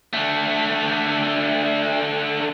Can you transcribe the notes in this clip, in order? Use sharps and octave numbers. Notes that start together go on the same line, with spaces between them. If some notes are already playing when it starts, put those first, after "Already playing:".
D3 A3